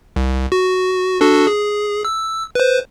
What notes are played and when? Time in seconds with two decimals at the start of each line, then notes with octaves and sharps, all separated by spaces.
0.16 C2
0.52 F#4
1.21 D4 F#4 A4
1.47 G#4
2.05 E6
2.55 B4 C5